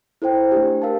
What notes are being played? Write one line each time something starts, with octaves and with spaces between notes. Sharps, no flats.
E4 A4 C5 G5
A3 D4 G4
A#4 F5 A5